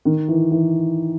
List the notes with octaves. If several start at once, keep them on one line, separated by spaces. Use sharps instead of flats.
D#3
E3
E3